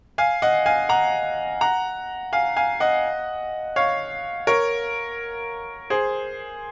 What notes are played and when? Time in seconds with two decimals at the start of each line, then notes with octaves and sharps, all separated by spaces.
0.18 F5 G#5
0.42 D#5 F#5
0.66 F5 G#5
0.89 F#5 A#5
1.61 F#5 A#5
2.32 F5 G#5
2.56 F5 G#5
2.80 D#5 F#5
3.76 C#5 F5
4.47 A#4 C#5
5.90 G#4 C5